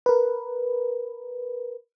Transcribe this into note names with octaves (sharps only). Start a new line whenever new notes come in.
A#4 B4